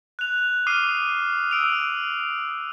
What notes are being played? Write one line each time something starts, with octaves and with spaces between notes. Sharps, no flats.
F#6 F7
D6 D#6 F6 C7 D#7
E6 D7 F7